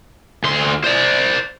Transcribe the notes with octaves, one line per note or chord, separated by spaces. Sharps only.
D2 C6
C5 D5